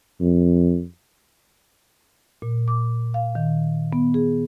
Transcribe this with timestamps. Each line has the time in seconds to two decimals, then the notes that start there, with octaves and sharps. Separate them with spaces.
0.21 F2
2.42 A#2
2.68 D6
3.14 F5
3.35 D#3
3.93 B3
4.14 G#4